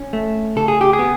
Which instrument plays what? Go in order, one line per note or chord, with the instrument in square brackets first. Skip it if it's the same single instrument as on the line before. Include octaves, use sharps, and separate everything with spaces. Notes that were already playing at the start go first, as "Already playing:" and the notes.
Already playing: [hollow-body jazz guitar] C#4
A3
C#3 A4
G#4
G4
G#4
B3